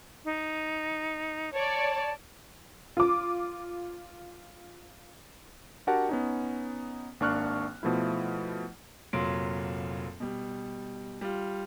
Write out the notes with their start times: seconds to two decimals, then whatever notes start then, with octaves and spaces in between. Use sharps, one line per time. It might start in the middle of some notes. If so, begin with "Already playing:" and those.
0.25 D#4
1.53 C#5 D5 A5
2.97 F4 D6
5.87 D4 F#4 G4 A#4 F#5 A5
6.09 B3 C#4 D#4
7.20 G#1 A#3 D4 C#6 F6 F#6
7.83 B2 F3 A3 E4
9.13 F1 A#2 F#3 F4 C6 D7
10.20 B2 G3
11.21 G3 F4